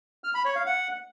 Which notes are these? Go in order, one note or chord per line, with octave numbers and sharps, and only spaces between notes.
F6
B5
C#5
F5
F#5